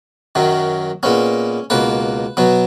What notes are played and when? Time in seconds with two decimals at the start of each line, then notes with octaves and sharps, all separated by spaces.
0.35 F#2 D#3 F#3
1.03 A#2 G#3 B3 C#4
1.70 C#2 B2 A#3 B4
2.37 B2 F#3 B3